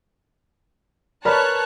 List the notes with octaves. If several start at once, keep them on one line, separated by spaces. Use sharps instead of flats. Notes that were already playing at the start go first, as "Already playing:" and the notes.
A#4 B4 C#5 D5 A5 B5 F#6